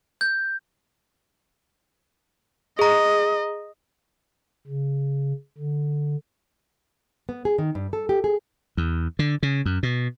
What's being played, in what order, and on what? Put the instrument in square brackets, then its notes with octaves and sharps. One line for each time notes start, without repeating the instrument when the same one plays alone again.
[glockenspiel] G6
[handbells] G#4 A#5 [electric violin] D#5
[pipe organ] C#3
D3
[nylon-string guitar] B3
G#4
D#3
G2
A4
G4
G#4
[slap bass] E2
D3
C#3
F#2
B2